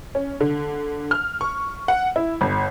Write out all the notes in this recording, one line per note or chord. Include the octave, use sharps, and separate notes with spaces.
C#4
D3
F6
C#6
F#5
E4
G1